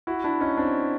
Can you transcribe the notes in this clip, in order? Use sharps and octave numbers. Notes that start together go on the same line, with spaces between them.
E4 F#4
D4 E4
C#4 D#4
C4 D4